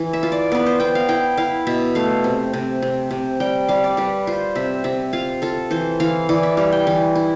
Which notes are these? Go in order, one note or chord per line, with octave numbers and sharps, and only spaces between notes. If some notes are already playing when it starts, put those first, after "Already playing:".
Already playing: E3
E5
F4
D5
B3 B4
C5
B3 G5
F5
E4 G5
E4 F5
B2 E5
A3 F5
C3
C3
C3
C3
G3 G5
G3 F5
D5
G3 B4
F4 C5
C3 E5
C3 E5
F4 F5
F4 A4
E3 C5
E3 F5
E3 D5
E5
G3 F5
G5
E3
E4